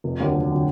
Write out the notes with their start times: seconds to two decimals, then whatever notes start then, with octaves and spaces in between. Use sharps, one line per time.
0.04 F1
0.20 D#2 D3 F#3
0.35 F1
0.52 D3 F#3